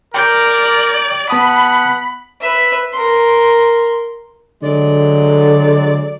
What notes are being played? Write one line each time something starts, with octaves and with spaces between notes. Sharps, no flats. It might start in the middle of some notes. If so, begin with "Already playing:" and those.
A#4 D5 G5 G6
B3 F#5 A5 B5 D#6
B4 E5
A#4 C6
D3 F#3 G#3 D5